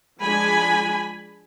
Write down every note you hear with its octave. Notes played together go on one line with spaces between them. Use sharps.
F3 G#3 D4 G#5 B5